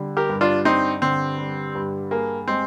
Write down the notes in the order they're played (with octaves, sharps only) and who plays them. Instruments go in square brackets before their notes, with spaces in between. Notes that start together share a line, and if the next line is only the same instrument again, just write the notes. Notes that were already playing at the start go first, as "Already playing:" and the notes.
Already playing: [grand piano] D3 G3
[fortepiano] G4 A#4
[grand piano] G2
[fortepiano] D4 F4
[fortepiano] C4 D#4 [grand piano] D4
[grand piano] D3 [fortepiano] C4
[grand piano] G3
G2
[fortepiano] A#3 [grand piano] G#4
[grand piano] G#3 [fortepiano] C4